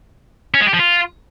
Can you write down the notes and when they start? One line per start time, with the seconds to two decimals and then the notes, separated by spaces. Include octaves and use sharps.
0.54 C#4
0.61 G#3
0.67 G4
0.73 F3
0.80 F4